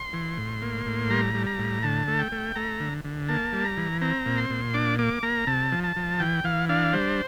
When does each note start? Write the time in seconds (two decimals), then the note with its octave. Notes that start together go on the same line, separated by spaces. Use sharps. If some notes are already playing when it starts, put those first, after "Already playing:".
Already playing: C6
0.13 E3
0.37 A2
0.62 A#3
0.86 A2
1.10 G3 A#5
1.34 G3
1.47 A#5
1.59 A2
1.83 D3 A5
2.08 A3
2.19 G5
2.32 A3
2.55 A3 A#5
2.80 D3
3.04 D3
3.28 A#3 A5
3.53 G3
3.65 A#5
3.77 E3
4.02 C4 A#5
4.26 A#2
4.37 C6
4.50 A#2
4.74 D4 D6
4.99 A#3 D6
5.23 A#3 A#5
5.47 C3 A5
5.72 F3
5.84 A5
5.96 F3
6.20 E3 G5
6.44 E3 F5
6.69 D4 F5
6.93 G3 C5